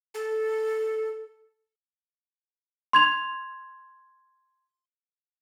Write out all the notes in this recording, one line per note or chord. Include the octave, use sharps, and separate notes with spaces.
A4
C6 G#6 F7